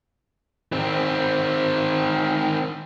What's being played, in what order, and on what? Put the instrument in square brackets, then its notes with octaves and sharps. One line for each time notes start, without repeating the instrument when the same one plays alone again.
[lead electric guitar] D#3 C4